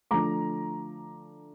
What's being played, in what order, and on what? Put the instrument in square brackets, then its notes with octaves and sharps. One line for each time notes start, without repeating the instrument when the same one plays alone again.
[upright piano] D3 F3 A3 A#5 D6